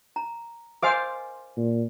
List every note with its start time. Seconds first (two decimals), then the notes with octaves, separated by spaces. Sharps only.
0.16 A#5
0.83 A#4 C5 D#5 F5 G#5 D6
1.57 A#2